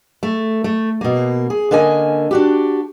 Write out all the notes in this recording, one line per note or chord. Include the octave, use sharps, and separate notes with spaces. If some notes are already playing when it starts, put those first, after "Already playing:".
A3
A3
B2 A#3
G#4
D3 A#3 C#4 D#5 G#5
D4 F#4 G4